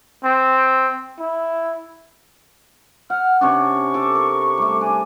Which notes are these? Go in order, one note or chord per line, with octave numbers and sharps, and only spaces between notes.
C4
E4
F#5 F6
C3 C#4 D4 C#6
A4 D6
A#4
G3 A3
D4 G#5